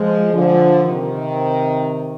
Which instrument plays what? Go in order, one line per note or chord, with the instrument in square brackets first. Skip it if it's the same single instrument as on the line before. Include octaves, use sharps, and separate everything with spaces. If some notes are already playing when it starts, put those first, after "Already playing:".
Already playing: [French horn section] F3 G#3
D3 F3
C3 D#3